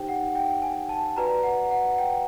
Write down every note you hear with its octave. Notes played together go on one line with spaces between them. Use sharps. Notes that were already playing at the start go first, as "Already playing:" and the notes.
Already playing: D#4 G4 C5 G5
F#5
G5
G#5
A5
F#4 B4 D5 A#5
F#5
F#5
G5